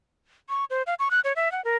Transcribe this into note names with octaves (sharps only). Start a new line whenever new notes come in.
C#6
C5
F5
C#6
F#6
C#5
E5
F#5
A#4